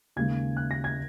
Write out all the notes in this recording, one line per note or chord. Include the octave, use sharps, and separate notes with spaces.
D#2 C#3 G#3 G#6
F#6
A#6
G#6